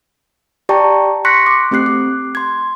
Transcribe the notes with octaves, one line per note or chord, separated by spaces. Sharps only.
G4 D5 G5 A5 A#5 C#6
C6 C#6 F#6 A#6 B6 C#7
D6
A3 C4 G4 F#6 C7
D6
C6 G#6